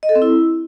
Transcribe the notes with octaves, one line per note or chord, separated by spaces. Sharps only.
D#5
A4
C4
E4